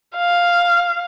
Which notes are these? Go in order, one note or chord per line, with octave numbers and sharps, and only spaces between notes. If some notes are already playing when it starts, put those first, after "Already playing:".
F5